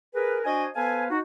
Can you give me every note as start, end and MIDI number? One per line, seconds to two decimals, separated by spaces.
0.14 0.39 68
0.14 0.39 70
0.14 0.39 71
0.44 0.66 62
0.44 0.66 66
0.44 0.66 72
0.44 0.66 75
0.44 0.66 80
0.75 1.05 59
0.75 1.05 69
0.75 1.05 71
0.75 1.05 72
0.75 1.05 77
0.75 1.05 80
1.09 1.18 63
1.09 1.18 66